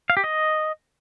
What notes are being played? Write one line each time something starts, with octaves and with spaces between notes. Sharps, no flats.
F5
G4
D#5